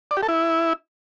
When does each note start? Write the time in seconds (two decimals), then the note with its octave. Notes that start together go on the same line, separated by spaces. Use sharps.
0.11 D5
0.17 G4
0.23 A4
0.28 E4